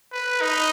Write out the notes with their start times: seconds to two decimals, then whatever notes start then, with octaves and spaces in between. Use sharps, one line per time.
0.12 B4
0.41 D#4